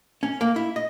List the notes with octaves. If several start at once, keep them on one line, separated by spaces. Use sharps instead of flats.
C#4
A#3
E4
D#5